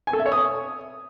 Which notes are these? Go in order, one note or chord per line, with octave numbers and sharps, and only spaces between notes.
G#5
A4
E5
C#5
D#6